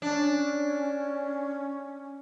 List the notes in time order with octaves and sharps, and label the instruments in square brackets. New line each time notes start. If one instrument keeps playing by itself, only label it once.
[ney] C#4 [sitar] D4